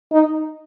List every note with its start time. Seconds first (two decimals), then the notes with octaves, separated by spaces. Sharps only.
0.12 D#4